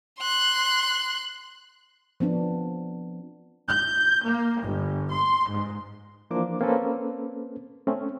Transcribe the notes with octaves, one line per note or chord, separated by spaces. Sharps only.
C6 F#6
F3 B3 C4 D4
G6
A#3
G1
C6
G#2
E3 F3 A#3 D4 C5 D6
A#3 C4 C#4 A4 B4 C5
A3 C4 C#4